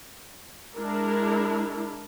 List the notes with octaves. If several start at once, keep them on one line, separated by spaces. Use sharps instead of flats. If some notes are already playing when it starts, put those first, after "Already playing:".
G#3 D4 E4 A#4